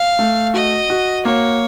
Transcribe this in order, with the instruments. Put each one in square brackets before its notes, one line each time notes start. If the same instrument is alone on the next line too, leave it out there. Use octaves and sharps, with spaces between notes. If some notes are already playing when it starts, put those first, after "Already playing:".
Already playing: [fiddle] F5
[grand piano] A3
[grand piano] F#4 [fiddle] D#5
[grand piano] F#4
[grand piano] A#3 [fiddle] C#5